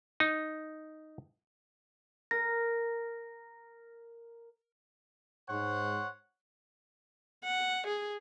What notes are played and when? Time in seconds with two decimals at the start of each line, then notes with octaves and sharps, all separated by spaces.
0.20 D#4
2.31 A#4 A#6
5.50 G#2 C5 C#5 F#5
7.44 F#5
7.88 G#4